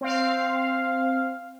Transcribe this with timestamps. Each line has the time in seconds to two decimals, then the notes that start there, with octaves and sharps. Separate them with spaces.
0.01 C4 F5